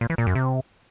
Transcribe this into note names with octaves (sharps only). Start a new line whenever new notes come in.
A#2
E3
A#2
F#2
C3